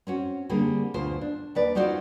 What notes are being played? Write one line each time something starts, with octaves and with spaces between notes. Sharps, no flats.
C4 C#4 F#4
D3 G3 A#3 C4 G#4
D2 B2 F4 C5
D4
D#2 B4 D5
C#4 D#4 F4 F#4 C5 D5